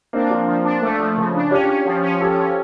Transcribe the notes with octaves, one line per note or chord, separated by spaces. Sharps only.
A#3 C4 D4
F3
F3
D4
A3
F3
C#3
D4
C#4 F4 G4
C#4
F3
C#4
F3 G4 A4
C#4